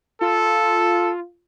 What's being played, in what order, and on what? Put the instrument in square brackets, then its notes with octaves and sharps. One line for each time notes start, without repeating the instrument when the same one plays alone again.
[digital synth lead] F4 [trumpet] A4